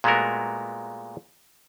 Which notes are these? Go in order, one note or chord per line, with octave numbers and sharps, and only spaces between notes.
A#2 G#3 A3 B3 F#4 A#4